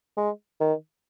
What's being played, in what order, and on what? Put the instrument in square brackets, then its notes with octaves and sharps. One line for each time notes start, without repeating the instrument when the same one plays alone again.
[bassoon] G#3
D#3